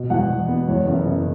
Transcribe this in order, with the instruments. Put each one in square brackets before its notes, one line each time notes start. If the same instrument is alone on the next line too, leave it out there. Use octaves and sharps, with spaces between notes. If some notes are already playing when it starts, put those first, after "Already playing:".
Already playing: [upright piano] B2
E2 F#5
E2
B3
E2 C#5
F#1
F#1